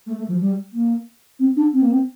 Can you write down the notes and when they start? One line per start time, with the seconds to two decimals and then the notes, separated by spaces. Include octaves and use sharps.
0.06 A3
0.18 A3
0.28 F3
0.40 G3
0.73 A#3
1.39 C4
1.56 D4
1.72 C4
1.82 A#3
1.91 C4